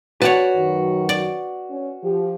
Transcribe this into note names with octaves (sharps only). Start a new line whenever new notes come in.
F#4 B4 C#5 D5 F#5 A5
F#2 D#3 F#3
D5
C#4
F3 G4